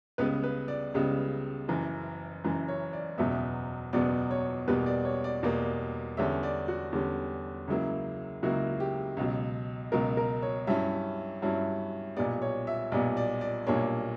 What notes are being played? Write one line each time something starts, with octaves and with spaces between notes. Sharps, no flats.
C#2 C#3 G3 B3 B4
B4
D5
C#2 C#3 G3 B3
F#1 F#2 E3
F#1 F#2 E3
C#5
D5
F#1 E2 B2 F#3 B3 E5
F#1 E2 B2 F#3 B3 D5
C#5
E2 B2 G3 A#3 B4
D5
C#5
D5
E2 B2 G3 A#3
E2 D3 G3 C#4 E5
D5
F#4
E2 D3 G3 C#4
C#2 C#3 F#3 A#3 E4
C#2 C#3 F#3 A#3 E4 F#4
G4
C#2 B2 F#3
C#2 B2 F#3 A#4
A#4
C#5
G2 F#3 C#4 E4 E5
G2 F#3 C#4 E4
B1 A#2 G3 B3 D5
C#5
E5
B1 A#2 G3 B3 D5
D5
D5
B1 A#2 G3 A#3 D4 C#5